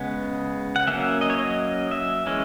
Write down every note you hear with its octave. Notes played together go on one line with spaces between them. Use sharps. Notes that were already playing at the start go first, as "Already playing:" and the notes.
Already playing: C#3 G#3 B3
F#5
F#3 A#3 C#4 E5
D#5
C#5
D#5
E5
E3 G#3 C#4